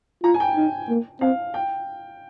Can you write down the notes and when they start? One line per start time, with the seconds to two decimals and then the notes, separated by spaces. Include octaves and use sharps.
0.23 F4 A#5
0.34 G#5
0.40 G5
0.56 D#4
0.89 A#3
1.21 C4 F5
1.54 G5